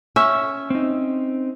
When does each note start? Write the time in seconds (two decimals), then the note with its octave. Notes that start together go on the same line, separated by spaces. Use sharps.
0.16 C#4 E5
0.70 C4 D#4